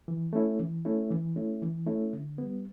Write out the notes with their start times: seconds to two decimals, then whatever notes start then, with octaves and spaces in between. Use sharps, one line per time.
0.08 E3
0.33 A3 C#4 E4
0.59 E3
0.85 A3 C#4 E4
1.11 E3
1.36 A3 C#4 E4
1.62 E3
1.87 A3 C#4 E4
2.13 D3
2.38 G3 B3